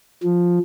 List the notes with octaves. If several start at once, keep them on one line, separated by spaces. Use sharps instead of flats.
F3